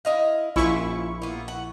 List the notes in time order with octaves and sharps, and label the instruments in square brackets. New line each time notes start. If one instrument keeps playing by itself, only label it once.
[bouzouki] E4 D#5 F5
[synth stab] A#1 E4 C#6 [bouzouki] C#4 F4
[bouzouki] A#3 B3
F#5